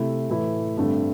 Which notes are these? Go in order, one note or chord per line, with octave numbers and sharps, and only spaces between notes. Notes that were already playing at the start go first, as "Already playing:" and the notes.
Already playing: C3 A3 E4
A2 E3 A3 E4
G2 D3 A3 C4